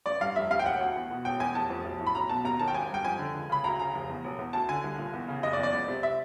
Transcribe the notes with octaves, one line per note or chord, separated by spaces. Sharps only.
A1 D5
G2 F5
F1 E5
D#2 F5
G5
E1 F#5
D2
E2
B2
E1 G5
E2 G#5
F1 A5
F2
B1
A2
B5
B1 A#5
B2 A5
D#2 A#5
D#3 A5
G5
G#1 G#5
G2 G5
F2 G#5
D3
C#2
C#3 B5
D2 A#5
C#3 A#5
F1
E2
E1
E2
D2 A5
D3 G#5
C2
A#2
E2
C#3
F#1 D#5
D5
E2
D5
C#2
C3
E5